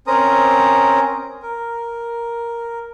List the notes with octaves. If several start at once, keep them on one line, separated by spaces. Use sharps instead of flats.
C4 C#4 A#4 C5 A#5 D#6
A#4